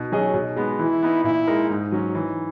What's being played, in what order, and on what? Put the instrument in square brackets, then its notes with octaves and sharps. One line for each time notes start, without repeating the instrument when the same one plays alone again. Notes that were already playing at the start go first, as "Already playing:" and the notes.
Already playing: [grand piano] B2 [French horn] D#4
[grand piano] F#3 C#4 G#4 D#5
[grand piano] B2 [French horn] D#4
[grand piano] G#3 B3
[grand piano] E3 [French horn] E4
[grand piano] B3 D#4
[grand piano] A#2 [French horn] E4
[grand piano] G#3 D#4 A#4
[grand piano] G#2 [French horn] D#4
[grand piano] F#3 C#4
[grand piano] E3 [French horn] D#4